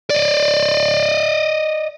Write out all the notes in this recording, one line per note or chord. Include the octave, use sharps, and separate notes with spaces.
D5 D#5